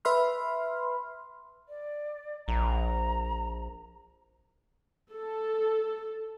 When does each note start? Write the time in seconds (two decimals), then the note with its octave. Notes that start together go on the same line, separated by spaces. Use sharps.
0.05 B4 E5 B5 C6 F6
1.69 D5
2.48 A#1 A#5
5.11 A4